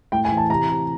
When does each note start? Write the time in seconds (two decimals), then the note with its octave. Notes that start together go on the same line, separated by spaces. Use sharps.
0.12 A2 G5
0.25 G#5
0.31 E3
0.37 A5
0.50 C3 A#5
0.69 C3